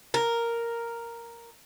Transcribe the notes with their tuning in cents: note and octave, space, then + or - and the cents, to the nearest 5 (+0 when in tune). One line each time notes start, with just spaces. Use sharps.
A#4 +0